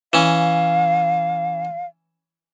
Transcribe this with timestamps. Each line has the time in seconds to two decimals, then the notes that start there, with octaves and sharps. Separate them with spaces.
0.13 E3 C#4 F5